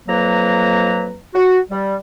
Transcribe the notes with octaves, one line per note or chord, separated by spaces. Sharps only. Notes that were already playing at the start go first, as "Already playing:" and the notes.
F2 F#3 A#3 B4 A#5
F#4
G3